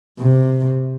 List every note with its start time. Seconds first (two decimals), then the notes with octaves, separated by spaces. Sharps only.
0.19 C3